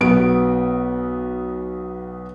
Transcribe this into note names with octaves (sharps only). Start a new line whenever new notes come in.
B1 B3 D7